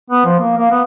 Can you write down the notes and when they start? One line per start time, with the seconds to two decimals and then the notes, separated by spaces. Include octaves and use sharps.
0.10 B3
0.25 F3
0.39 A#3
0.57 A#3
0.71 B3